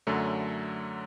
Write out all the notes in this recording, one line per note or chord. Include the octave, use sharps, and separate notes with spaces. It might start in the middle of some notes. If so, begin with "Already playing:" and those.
F#2 D3 F#3 A3